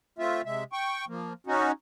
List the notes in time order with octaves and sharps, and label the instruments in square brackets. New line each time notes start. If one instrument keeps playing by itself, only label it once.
[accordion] A3 C4 F4 E5
C3 G#3 E5
G5 C#6
F3 A#3
C#4 D#4 F#4